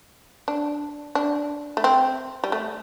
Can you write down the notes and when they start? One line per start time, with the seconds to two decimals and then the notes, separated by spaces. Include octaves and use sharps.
0.48 D4
1.15 D4
1.77 A3
1.84 C4
2.44 G3
2.52 A3